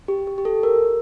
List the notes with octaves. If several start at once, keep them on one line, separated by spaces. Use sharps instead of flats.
G4
G4
G4
A4
A#4